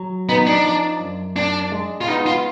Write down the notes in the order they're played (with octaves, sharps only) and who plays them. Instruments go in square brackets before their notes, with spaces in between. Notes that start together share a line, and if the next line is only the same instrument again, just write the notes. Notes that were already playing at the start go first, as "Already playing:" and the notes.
Already playing: [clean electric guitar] F#3
[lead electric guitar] B3 [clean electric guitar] D#4
[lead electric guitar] D4
[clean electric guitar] F3
F#2
[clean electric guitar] F#2 [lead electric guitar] D4
[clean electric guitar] G#3
[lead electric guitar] F4
[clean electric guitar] B3 [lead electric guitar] D#4
[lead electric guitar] F4